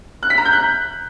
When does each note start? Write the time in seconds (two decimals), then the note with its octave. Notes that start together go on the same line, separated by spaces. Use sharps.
0.23 F#6
0.30 B6
0.38 A#5
0.45 G6
0.53 F#6